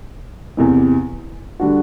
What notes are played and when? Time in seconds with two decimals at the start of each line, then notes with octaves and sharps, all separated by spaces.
0.57 E2 C3 E3
1.60 D3 G3 D4 F#4